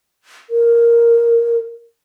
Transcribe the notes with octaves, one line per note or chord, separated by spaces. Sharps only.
A#4